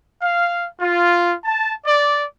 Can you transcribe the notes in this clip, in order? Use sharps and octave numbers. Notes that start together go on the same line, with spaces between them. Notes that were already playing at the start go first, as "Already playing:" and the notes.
F5
F4
A5
D5